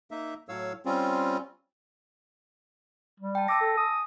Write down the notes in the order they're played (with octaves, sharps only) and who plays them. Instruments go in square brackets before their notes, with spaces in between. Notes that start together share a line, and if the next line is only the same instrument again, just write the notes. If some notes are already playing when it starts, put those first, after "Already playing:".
[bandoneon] A#3 D#4 E5
A2 F#3 C#5 F5 E6
G3 C4 C#4 F4
[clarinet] G3
[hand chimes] G5 A5
[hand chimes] A5 E6 A#6 [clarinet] D6
[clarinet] A4
[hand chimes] G#5 [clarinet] D#6